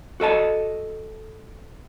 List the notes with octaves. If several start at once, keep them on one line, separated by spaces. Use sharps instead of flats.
F#4 A4 D#5 A5